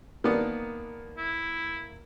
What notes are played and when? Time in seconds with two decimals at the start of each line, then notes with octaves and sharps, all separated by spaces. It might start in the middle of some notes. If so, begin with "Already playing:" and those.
0.24 D#3 A#3 B3 D4
1.18 E4